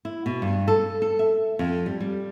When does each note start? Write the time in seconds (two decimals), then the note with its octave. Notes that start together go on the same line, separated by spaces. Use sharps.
0.05 E4
0.26 B2
0.42 G2
0.68 A4
1.02 A4
1.19 E5
1.59 F2
1.86 G3
2.00 G3